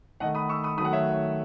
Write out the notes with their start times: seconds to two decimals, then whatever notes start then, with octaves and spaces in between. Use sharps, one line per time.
0.20 D#3 A3 D#5 F#5
0.35 B5 D#6
0.49 C#6 E6
0.63 B5 D#6
0.78 D#3 F#3 A3 B5 D#6
0.85 F#5
0.93 C#5 E5